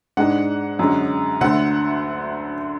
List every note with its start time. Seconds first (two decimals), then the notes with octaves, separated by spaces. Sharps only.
0.17 G#2 G#3 D4 F#5
0.79 F#2 D3 G#3 C#4
1.41 D2 D3 A3 F#5